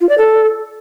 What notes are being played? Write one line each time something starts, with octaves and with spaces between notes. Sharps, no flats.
F4
D5
A4